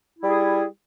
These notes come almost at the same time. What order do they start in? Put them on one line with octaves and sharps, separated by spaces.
E4 G3 G#4